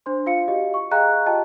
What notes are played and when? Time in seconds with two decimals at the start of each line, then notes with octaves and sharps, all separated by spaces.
0.06 D4 C5 C6
0.26 F4 F5 C#7
0.48 F#4 G4 D#5 F5
0.74 C#6
0.91 G#4 D#5 F5 G5 A#5 F#6
1.26 F4 G4 D#5 G5 A5